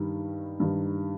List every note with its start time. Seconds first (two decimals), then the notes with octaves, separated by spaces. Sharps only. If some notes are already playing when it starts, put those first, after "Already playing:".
Already playing: G2 D#3 G3
0.60 G2 D#3 G3